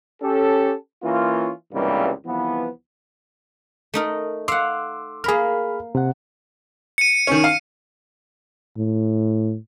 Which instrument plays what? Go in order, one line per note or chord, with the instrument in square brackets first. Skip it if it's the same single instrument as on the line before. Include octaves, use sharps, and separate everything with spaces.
[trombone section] C#4 G4 A4
E3 A#3 C#4 F4
C#2 G2 C3 E3 G3 A#3
C2 E3 F3 B3
[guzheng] A3 D#4 A#4
[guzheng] F5 F#5 [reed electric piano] C6 D6 E6
[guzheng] A#3 A#4 [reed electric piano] G#4 B5 F6
[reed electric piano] C3 F#5
[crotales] C#7 D#7
[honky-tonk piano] D#3 C#4
F5
[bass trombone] A2